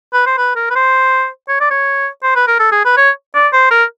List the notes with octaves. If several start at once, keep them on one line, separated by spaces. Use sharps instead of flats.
B4
C5
B4
A#4
B4
C5
C#5
D5
C#5
C5
B4
A#4
A4
G#4
B4
C#5
D5
C5
A#4